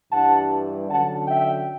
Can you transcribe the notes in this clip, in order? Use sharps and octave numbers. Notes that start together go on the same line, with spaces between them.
G2 E3 G3 D4 F#5 A5
D3 F#3 C#4 F#5 A5
E5 G5